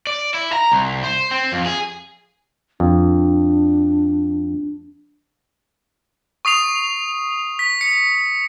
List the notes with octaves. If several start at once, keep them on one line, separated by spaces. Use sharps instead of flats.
D5
E4
A#5
C2
C5
C4
F2
G#4
F2 D4
C#6 D#6 C7 F7
B6
C#7